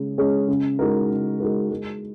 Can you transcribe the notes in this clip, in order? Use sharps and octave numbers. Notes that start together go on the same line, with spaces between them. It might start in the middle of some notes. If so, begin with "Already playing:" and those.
Already playing: C#3 G#3 C#4 G#4
G#3 C#4 G#4
C#3
G#3 D#4 F#4 A#4
C#3
G#3 D#4 F#4 A#4
G#3